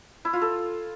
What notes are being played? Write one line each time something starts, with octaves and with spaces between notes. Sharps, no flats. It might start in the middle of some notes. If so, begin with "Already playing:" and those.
E4
F4
A4